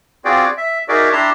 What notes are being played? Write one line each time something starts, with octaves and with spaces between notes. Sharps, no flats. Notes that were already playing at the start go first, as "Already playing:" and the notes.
C4 F4 F#4 G#4 D5 G5
E5
D#4 F#4 G#4 A#4 D5 E5
D4 E4 G4 A5 A#5 C6